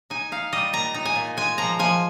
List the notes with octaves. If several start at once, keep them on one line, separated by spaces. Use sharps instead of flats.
D#4 G#5
D#4 F5
G3 D#5
A#2 A#5
D#4 A#5
G#5
A#2
G#3 G#5
F3 A#5
F3 G#5